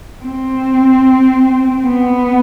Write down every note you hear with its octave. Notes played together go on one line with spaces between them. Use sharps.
C4
B3